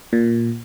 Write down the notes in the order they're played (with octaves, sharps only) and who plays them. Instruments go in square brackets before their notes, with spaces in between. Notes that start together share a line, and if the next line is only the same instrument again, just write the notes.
[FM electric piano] A#2